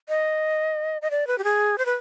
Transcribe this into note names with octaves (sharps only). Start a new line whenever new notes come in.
D#5
D#5
D5
B4
G4
G#4
C5
B4